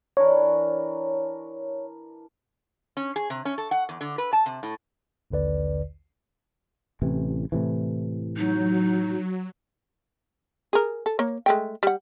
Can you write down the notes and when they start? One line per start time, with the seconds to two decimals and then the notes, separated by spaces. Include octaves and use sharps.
0.17 E3 D4 A#4 C#5
2.97 C#4
3.16 G#4
3.30 C3
3.45 C#4
3.58 A4
3.71 F#5
3.89 E2
4.01 D3
4.18 B4
4.33 A5
4.46 C3
4.63 A2
5.31 A#1 D#2 D3 B4 D5
7.02 A1 C3 E3
7.52 A2 C3 E3
8.37 F#3 D#4
10.73 G#4 A#4
11.06 A4
11.19 A#3 C#5
11.46 G#3 A3 G5
11.83 G3 F#5